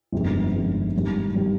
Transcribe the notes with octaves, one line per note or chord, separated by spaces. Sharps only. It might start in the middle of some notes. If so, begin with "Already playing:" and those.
G1 F2 C3 D#3 G#3
G1 F2 C3 D#3 G#3
G#2 D#3 G3
D#3 G3